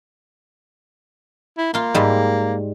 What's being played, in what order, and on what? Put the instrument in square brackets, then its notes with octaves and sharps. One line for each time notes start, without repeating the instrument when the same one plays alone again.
[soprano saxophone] E4
[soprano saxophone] A#3 [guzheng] F4 C6
[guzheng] G#2 G3